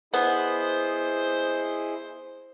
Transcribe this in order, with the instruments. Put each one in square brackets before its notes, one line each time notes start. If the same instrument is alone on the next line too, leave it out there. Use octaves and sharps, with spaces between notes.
[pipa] B3 [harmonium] E4 G#4 D#5 [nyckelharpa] C5